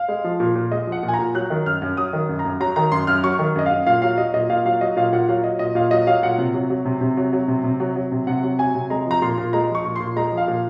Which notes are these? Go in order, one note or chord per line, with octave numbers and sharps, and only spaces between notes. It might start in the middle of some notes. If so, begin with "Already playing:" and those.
Already playing: F5
G#3
F3
A#2
A#2
G#3 D#5
F3
F#5
A#2
G#5
A#5
A#2
F#3 F#6
D#3
F#2 F6
F#2
F#3 D#6
D#3
F#2
A#5
F#2
F#3 A#5
D#3 A#5
F#2 C6
F#2 F6
F#3 C#6
D#3
F#2 D#5
F#2 F5
A#2 F5
F#3 F5
F#3 D#5
A#2 D#5
A#2 F5
F#3 F5
F#3 D#5
A#2 F5
A#2 F#5
F#3 F5
F#3 D#5
A#2 D#5
A#2 F5
F#3 D#5
F#3 F5
A#2 F#5
C3
F#3
F#3
C3
C3
F#3
F#3
C3
C3
F#3
F#3
C3
C3 F#5
F#3
F#3 G#5
C3
G#3 A#5
F3 A#5
A#2 C6
A#2
G#3 A#5
F3
C#6
A#2
A#2 C6
G#3 A#5
F3
F5
A#2